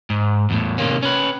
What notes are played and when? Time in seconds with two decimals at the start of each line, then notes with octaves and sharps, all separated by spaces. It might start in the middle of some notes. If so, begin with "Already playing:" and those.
0.10 G#2
0.50 E2 A2
0.78 C3 D#3 A#3 C#4
1.03 C#4 B4